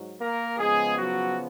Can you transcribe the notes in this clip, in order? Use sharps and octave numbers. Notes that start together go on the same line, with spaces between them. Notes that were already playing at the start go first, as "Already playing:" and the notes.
Already playing: G#2 F#3
A#3 A#4
C#3 F3 G#3 B3 G#4
F#3 F#4